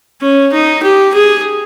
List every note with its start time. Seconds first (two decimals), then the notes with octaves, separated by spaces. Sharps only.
0.21 C#4
0.53 D#4
0.83 G4
1.14 G#4